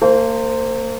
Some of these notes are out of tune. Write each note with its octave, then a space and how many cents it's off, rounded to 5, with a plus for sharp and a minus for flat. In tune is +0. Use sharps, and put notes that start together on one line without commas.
A#3 -35 C5 +0